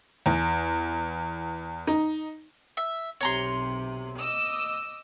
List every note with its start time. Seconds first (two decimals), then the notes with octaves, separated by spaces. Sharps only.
0.26 E2
1.87 D#4
2.77 E5
3.21 B1 C3 C#5 A#5 C6
4.18 D#5 D6 E6